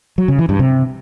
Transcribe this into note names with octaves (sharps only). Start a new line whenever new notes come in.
F#3
C#3
E3
G2
C3